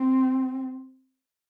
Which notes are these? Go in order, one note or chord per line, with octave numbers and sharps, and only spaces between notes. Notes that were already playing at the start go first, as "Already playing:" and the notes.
Already playing: C4